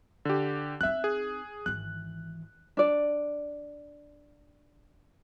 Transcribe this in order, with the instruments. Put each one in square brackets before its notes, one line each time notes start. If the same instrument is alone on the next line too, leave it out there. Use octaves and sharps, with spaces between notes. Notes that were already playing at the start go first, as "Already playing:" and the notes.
[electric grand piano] D3 G4
[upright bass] C4 D#4 [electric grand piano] E5 F#6
[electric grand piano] G#4
[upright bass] G#1 E3 [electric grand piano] F#6
[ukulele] D4 D5